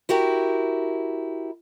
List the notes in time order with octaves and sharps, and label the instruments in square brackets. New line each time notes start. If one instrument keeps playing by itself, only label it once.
[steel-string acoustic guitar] E4 F#4 G4 A#4